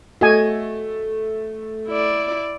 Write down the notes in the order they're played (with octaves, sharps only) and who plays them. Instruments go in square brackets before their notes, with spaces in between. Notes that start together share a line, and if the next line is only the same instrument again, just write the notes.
[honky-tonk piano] A3 [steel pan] F#4 D#5 G#5
[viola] E4 D5